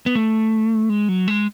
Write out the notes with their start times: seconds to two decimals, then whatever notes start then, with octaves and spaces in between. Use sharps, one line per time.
0.06 B3
0.15 A3
0.89 G#3
1.09 F#3
1.28 G#3